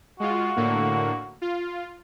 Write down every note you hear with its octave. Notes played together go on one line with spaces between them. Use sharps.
G#3 F4 F#4
A2 D3 A#3
F4